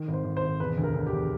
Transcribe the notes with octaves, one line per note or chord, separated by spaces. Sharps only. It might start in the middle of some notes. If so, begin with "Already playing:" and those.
Already playing: D#3
G#1
C5
G#1
C5
G#1
E1 B4
D2
A#4
D2
G4
E1